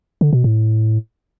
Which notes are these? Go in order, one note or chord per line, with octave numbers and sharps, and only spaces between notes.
D3
B2
A2